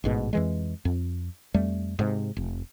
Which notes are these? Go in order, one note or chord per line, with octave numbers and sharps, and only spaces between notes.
A1 G#2 B2
F2 E3 G#3
F2
F2 G3 A3
G#2 C3
F1